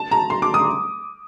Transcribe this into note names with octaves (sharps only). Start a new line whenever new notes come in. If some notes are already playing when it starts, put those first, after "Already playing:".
Already playing: A5
A#5
C6
D6
D#6